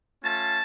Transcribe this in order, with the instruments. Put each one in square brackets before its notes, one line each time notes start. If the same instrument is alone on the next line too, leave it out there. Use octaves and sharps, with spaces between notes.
[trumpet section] A3 C#4 F4 A5